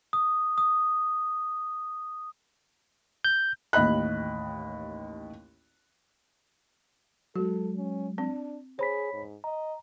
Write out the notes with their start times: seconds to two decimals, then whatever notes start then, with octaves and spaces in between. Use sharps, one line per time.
0.13 D#6
0.58 D#6
3.25 G6
3.73 A1 D#2 D#5 B5 F#6
7.36 F#3 G#3 F#4 A4
7.77 C#4
8.18 C4 D4
8.79 G#4 C5 C#5 B5 B6
9.13 G#2
9.44 D#5 A#5